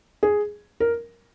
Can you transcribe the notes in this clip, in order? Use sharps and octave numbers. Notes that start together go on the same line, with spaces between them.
G#4
A#4